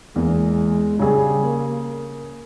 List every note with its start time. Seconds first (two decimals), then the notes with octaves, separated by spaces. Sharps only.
0.16 E2 G#3 A#3
0.99 C#3 G3 G#4
1.45 A#3